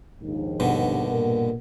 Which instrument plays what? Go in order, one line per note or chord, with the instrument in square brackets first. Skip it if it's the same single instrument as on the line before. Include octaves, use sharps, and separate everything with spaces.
[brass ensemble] A#1 D#2 G#2
[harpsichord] G2 B2 D3
[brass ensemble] A#2 A#4